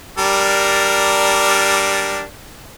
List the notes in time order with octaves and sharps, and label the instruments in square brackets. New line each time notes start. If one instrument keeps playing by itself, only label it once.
[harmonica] G3 D4 A#4